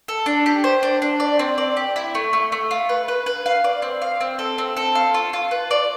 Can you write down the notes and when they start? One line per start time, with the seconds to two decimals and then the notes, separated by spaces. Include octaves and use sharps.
0.08 A4
0.26 D4
0.46 G4
0.64 C5
0.83 D4
1.02 D4
1.20 D5
1.39 C4
1.58 D5
1.77 G4
1.96 E4
2.15 A3
2.33 A3
2.52 A3
2.71 F4
2.89 B4
3.08 B4
3.26 B4
3.46 F5
3.64 D5
3.82 C4
4.02 F5
4.21 C4
4.39 A4
4.58 C4
4.77 A4
4.95 F5
5.14 F4
5.33 F4
5.51 B4
5.71 D5